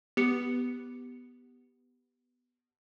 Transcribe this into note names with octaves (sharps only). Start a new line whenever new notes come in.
B3 G4 C#7